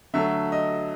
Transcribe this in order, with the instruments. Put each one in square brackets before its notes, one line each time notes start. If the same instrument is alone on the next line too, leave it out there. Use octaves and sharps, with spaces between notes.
[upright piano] D3 F#3 A3 E5
D#5